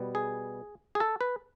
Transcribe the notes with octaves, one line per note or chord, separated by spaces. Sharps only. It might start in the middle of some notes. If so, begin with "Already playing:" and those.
Already playing: B2 G3 B3
G#4
G#4
A4
B4